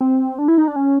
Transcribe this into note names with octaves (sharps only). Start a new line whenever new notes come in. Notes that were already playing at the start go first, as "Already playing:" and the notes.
C4
D4
E4
D#4
D4
C#4